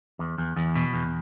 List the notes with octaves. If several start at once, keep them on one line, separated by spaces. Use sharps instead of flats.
E2
E2
E2
B2
E2